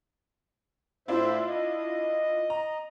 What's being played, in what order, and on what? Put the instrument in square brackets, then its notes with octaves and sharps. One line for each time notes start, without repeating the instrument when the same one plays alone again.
[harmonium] A2 C5 E5 [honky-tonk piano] D4 E4 F4
[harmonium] D#5
[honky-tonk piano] A#5